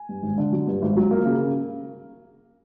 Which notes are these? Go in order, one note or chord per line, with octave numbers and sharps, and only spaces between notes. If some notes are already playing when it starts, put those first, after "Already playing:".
Already playing: G#5
G2
G#1
D3
F#3
G2
G#1
F#3
A#3
C#3